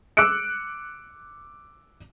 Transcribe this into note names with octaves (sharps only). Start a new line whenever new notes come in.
D6 E6 F#6 C#7 D7